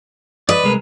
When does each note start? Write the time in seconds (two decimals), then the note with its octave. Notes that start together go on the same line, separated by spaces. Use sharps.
0.49 B4 D5 D#5
0.64 C2 G#3 A#4